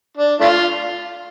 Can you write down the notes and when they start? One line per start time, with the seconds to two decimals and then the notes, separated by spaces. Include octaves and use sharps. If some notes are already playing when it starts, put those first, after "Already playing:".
0.17 D4
0.41 A3 D4 F4